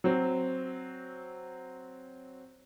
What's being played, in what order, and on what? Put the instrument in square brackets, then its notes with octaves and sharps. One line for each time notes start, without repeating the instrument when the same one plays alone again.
[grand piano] F#3 C4